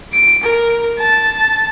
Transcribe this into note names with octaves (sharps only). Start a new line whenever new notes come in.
D7
A#4
A5